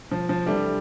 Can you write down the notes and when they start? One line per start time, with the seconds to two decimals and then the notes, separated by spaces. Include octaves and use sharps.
0.11 F3
0.29 F3
0.46 C3 E3 G3 A3 D4